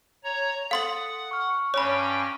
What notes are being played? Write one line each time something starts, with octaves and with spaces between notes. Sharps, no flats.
C#5 A#5
A4 F5 F#5 C6 D#6 A6 F#7
C#6 F6
G2 C#4 C#5 G5 B5